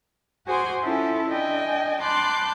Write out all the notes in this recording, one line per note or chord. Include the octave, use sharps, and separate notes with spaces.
F#4 G#4 C5 G#5 C6 D6
C#4 E4 F4 A4
D4 D#5 G5 G#5
A5 B5 C6 D6 F#6 G6